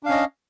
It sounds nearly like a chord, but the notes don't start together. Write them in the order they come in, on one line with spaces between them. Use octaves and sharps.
D4 F5 C#4 D#5